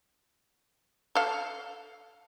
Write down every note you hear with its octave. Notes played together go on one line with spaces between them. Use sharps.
A4 F5